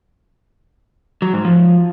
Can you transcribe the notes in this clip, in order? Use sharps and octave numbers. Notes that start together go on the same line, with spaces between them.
F#3
G#2
F3